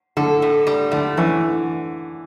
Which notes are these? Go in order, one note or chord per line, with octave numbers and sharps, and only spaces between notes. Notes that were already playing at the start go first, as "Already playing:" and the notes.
D3 A4
A2
G3
D3 A3
E3 C#4